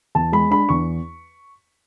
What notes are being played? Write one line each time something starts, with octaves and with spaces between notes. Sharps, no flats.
E2 A5
G#3 B5
D4 B5
E2 C#6